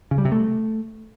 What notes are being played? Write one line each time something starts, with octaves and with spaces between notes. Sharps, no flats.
C#3
G3
C3
A3